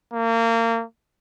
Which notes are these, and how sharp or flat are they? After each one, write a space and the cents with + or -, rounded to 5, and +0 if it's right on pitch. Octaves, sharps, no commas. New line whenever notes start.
A#3 -30